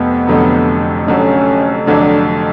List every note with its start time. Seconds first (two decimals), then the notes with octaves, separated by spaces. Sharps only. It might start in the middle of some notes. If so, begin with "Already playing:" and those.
Already playing: F1 F2 B3
0.27 F1 F2 D3 F#3
1.07 F1 F2 D3 F#3 C#4
1.87 F1 F2 D3 F#3 D4